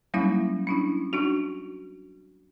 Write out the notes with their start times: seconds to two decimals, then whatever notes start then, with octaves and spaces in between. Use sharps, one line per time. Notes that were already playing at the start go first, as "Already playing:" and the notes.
0.14 F#3 G3 A#3 C#4 D#4 E4
0.67 C#4 D4 E4
1.13 D4 D#4 F#4